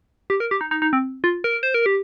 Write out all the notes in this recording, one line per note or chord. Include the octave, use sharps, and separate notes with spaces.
G4
A#4
G4
D#4
D#4
D#4
C4
F4
A#4
C5
A#4
G4